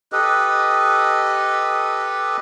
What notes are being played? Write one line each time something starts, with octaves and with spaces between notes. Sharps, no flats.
G4 A4 B4 D#5